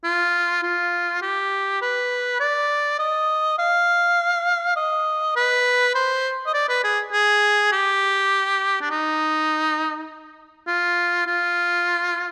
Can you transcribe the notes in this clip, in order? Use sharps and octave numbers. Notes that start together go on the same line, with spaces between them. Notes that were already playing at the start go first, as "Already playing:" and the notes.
F4
F4
G4
B4
D5
D#5
F5
D#5
B4
C5
D#5
D5
B4
G#4
G#4
G4
D4
D#4
F4
F4